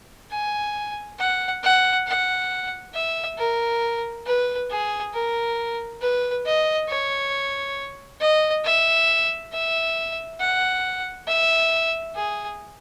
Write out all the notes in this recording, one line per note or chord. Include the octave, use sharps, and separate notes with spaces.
G#5
F#5
F#5
F#5
E5
A#4
B4
G#4
A#4
B4
D#5
C#5
D#5
E5
E5
F#5
E5
G#4